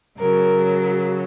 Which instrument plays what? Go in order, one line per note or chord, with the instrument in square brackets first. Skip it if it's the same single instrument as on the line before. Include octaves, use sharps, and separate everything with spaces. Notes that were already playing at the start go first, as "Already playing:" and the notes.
[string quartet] C#3 F#3 A#4